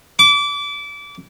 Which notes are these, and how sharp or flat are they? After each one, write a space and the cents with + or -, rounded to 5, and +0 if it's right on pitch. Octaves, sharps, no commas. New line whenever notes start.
D6 -25